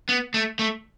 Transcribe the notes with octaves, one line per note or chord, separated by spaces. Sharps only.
B3
A3
A3